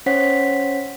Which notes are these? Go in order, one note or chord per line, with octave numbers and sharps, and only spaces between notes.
C#4 C5 C#5 F#5 B6